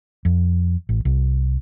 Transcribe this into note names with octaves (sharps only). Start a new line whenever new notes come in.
F2
A1
C2